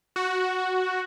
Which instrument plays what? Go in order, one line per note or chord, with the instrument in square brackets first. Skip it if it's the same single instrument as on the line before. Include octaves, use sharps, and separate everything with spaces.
[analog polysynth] F#4